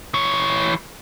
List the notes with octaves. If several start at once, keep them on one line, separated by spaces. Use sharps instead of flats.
E3 C#5